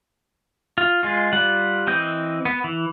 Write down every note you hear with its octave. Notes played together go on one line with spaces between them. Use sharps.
F4
G#3 F4
G3 F4 F#5
E3 C4 D#5 G6
B3
E3